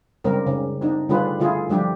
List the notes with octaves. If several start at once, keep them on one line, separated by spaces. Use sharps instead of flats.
C#3 G3 C4 A#4
C#3
C4 D4 D#4
D3 G3 D4 F4 G#4 B4
D3 E4 F4 G#4
F3 G3 D4 G4